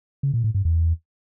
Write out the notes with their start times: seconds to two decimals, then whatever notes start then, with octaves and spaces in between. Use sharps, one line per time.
0.23 C#3
0.34 A#2
0.44 A2
0.55 G2
0.65 E2